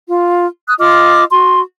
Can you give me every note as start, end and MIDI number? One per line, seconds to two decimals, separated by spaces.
0.07 0.45 65
0.68 0.74 87
0.68 0.74 90
0.79 1.23 65
0.79 1.23 75
0.79 1.23 86
0.79 1.23 89
1.31 1.60 66
1.31 1.60 84